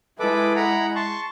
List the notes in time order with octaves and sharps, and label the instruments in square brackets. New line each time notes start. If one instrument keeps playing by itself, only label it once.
[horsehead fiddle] G#3 E4 [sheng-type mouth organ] A4 B4 D6
[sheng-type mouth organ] F#5 A#5 B5
A5 C6 C#6